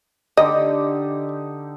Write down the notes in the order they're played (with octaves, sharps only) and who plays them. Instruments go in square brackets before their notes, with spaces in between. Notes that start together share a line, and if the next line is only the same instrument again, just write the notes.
[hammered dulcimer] D3 D#4 G4 [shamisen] D#5